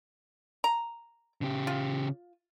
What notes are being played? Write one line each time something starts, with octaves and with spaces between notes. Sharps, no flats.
A#5
C#3 G4
F4